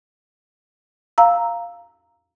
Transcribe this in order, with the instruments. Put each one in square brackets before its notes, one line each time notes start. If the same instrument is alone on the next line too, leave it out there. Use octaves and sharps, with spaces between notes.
[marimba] F5 A#5 E6